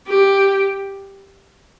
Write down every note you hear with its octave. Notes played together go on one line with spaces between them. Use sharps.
G4